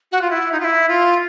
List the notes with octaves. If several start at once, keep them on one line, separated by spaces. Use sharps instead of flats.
F#4
F4
E4
D#4
F4
E4
F4